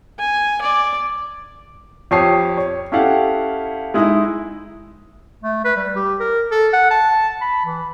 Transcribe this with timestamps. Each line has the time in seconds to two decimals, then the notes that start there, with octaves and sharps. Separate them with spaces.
0.19 G#5
0.61 D5
2.11 F2 G4 C#5 A5 D#6 C7
2.57 C#5
2.92 C#4 E4 G4 A4 F5 F#5
3.94 G#3 D#4 E4 G#4
5.43 A3
5.65 B4
5.77 G3
5.96 G4
6.20 A#4
6.51 A4
6.73 F#5
6.91 A5
7.41 B5
7.65 E3